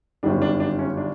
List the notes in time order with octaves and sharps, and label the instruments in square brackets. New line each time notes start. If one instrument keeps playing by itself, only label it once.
[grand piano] G1 F#2 D#3 G3 D4
D4
D4
C#4
D4